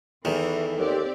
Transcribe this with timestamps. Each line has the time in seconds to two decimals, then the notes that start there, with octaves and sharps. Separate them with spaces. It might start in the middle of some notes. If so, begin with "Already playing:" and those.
0.25 E2 D#3 E3 A4
0.79 D#2 C4 G4 D5